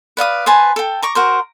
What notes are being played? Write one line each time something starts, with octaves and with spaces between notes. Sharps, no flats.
B4 D5 F5 D#6
B4 C5 G#5 A5
A4 G5
A#5 C#6 D6
F#4 A#4 C5